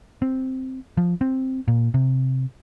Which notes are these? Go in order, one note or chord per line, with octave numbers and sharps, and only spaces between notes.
C4
F3
C4
A#2
C3